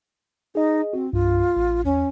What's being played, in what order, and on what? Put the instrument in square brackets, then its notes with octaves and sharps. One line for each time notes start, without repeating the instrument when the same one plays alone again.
[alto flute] D#4 [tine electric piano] G#4 D#5
[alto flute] C4 [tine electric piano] F#4
[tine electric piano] C2 G2 [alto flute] F4
[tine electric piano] A1
[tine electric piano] E2 [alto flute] C#4